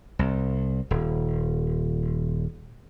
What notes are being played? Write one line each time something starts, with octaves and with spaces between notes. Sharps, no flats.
C2
D#1